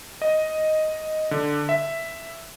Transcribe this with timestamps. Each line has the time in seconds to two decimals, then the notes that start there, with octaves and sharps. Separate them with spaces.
0.22 D#5
1.31 D3
1.69 E5